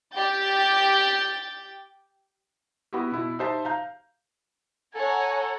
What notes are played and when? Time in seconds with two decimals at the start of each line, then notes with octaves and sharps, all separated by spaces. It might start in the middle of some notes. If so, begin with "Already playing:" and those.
0.14 G4 G5 G6 A6
2.93 B3 E4 F#4 G4
3.12 B2 E4
3.39 D#4 G4 C5 E5 A5
3.65 F5 A#5 G6
4.95 A4 C#5 F#5 G#5 A#5